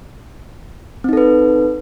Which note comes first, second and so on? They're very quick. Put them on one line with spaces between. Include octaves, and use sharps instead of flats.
C4 D#4 A4 B4